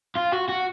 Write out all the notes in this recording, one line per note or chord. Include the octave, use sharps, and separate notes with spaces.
F4
F#4
F#4